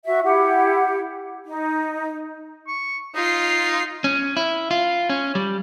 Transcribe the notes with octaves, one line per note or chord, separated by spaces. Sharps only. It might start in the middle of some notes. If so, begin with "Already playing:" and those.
F#4 E5
E4 G4 F#5
D#4
C#6
D#4 F4 C7
C#4
E4
F4
C#4
G3